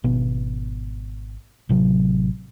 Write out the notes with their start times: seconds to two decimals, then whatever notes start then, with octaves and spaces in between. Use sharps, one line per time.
0.04 G#1 B2 B3
1.69 A1 C3 F#3